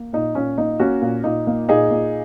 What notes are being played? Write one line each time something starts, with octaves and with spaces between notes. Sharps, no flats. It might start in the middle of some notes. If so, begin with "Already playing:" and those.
Already playing: A#3
A#2 D#4
A#2 C#4
A#3 D#4
A#3 C#4 F#4
A#2
A#2 D#4
A#3
A#2 D#4 G#4
A#2